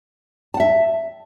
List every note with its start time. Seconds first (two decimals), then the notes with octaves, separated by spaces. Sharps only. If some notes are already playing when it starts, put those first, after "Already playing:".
0.54 A5
0.57 F#5
0.60 E5